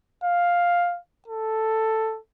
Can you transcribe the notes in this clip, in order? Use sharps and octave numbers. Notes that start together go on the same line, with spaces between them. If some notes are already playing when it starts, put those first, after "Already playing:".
F5
A4